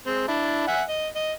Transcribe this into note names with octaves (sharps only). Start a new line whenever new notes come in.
G#3 C4
D4 E4
E5 F#5 G#5
D#5
D#5